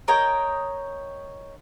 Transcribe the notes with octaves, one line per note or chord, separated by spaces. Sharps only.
A#4 C#5 D#5 G5